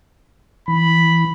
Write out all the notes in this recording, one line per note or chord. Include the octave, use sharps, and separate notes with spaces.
E3 B5